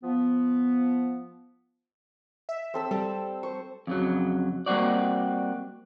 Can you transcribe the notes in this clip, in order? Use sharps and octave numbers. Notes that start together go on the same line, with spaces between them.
F3 B3
E5
C4 A4 E6
G3 A4
C5 C#6
F2 C#3 F#3
G3 A#3 C4 F#4 D5